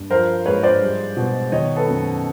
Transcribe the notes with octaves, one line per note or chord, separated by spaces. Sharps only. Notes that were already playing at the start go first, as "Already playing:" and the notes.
Already playing: G2
F3 A#4 C5
G#2 B4 C#5
C5 D5
G3
B2
D#3 C#5 D#5
A4 B4
F#2